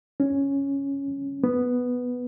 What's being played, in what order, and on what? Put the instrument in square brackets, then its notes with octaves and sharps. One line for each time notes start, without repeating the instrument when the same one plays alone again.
[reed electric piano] C#4
B3